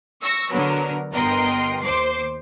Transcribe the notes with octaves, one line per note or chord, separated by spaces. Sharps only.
C#6 E6 A#6
D3 F#3 B3 A#4
G1 B3 A#4 D#5 G5 C6
D#2 C5 D6 C7